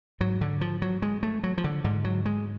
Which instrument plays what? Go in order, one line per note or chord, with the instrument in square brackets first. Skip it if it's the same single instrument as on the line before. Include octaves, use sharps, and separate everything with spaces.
[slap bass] G#2 F#3
D3
F3
F#3
G#3
A3
F#3
F3
D3
G#2 D3
F#3
G#3